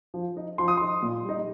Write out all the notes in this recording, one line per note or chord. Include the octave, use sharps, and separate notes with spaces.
F3
D#4
F3 C6
D#6
D#4 C6
A#2
G3 D#4